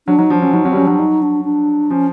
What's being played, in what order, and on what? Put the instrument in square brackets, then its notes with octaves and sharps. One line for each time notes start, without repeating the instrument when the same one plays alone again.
[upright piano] F#3 [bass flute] D4
[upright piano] F#3 [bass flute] D#4
[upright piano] F3 [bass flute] D4
[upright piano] F#3 [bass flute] C#4
[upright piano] F#3 [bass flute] D#4
[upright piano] F#3 [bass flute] C4
[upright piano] G3
[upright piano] F#3 [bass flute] C#4
[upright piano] F#3 [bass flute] D4
[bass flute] D#4
D4
D4
[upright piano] F3 [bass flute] C#4